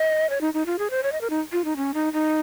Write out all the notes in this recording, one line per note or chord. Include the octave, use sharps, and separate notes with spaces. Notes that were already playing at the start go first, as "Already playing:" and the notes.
Already playing: D#5
C#5
D#4
D#4
F4
G#4
C5
C#5
D#5
A#4
D#4
F4
D#4
C#4
D#4
D#4